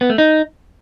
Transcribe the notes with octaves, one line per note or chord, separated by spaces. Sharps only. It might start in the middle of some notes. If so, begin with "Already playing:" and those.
B3
A3
D#4